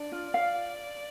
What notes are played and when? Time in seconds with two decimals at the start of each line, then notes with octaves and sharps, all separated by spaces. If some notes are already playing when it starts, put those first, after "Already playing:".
Already playing: D4 D5
0.12 F4
0.34 F5